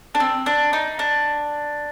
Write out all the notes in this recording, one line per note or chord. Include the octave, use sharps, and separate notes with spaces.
D4
C4
D4
D#4
D4